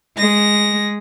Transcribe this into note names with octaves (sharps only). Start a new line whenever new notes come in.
G#3 A#6